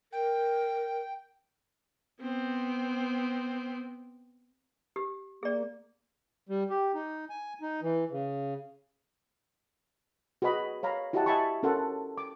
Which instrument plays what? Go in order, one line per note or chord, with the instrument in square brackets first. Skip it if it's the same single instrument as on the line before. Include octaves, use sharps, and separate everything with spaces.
[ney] A#4 [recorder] G5
[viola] B3 C4
[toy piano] G4
[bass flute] A#3 [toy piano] G#4 D5
[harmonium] G3
G4
D#4
G#5
D#4
E3
C#3
[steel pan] F#4 G#4 B4 D#5 B5
C#5 F5 A#5 B5
E4 F#4 G4 D#5 F#5 A5
D#5 E5 G#5 A5 B5 C#6
C#4 F#4 A4 A#4 F#5 C6
D6